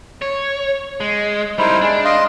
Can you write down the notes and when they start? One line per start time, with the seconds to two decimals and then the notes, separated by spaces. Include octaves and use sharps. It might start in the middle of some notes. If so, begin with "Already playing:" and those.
0.22 C#5
1.00 G#3
1.58 G3 D#4 E4 A#4 C5
1.82 G#3 D4
2.05 D#5 F5 C6